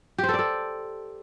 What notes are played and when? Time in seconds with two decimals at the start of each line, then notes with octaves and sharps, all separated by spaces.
0.18 G4
0.23 C5
0.29 A4
0.34 D5
0.39 A4